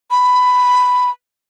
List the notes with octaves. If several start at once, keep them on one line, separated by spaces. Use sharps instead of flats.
B5